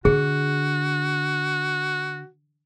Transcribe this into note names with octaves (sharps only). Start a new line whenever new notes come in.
D3 F#4 G#4